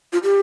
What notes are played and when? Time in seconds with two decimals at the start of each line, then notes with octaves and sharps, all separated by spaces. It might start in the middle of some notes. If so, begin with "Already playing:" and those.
0.13 F4
0.24 G4